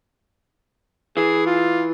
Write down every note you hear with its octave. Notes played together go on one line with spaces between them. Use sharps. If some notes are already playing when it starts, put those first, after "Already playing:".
E3 G#4
F4